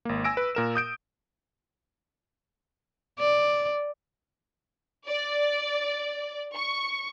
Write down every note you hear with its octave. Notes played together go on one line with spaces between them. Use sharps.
G#1 A#3
G#5 E6 A#6 D7
B4
A#2 A#4 E7
D#6 G6 D7
D5
D5
C#6